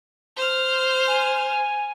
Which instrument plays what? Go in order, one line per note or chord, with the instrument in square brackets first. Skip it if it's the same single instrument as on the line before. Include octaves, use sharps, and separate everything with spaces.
[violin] C5 F6
[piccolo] G#5